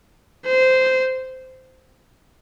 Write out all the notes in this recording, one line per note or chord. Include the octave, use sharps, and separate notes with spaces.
C5